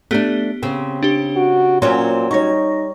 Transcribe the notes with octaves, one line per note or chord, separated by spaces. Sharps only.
A3 B3 D4 G4
C#3 C4
D4 G4
F#4
A#2 F#3 C4 C#4 C6
G3 D#4 C#5 C#6 A#6